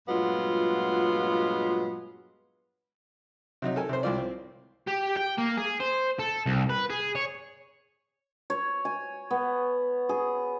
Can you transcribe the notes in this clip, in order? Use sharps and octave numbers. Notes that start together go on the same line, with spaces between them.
G2 A#2 F#3 G#3 B3 F4
C3 F#3 D#4
A4 A#4 G#5
C3 C5
C2 F4 D5
C4
G4
G5
A#3
G#4
C5
A4
C2
B4
G#4
C#5
C#5
G#5
B3
G#4